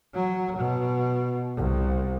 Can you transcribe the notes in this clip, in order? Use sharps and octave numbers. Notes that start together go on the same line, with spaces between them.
F#3
B2
C2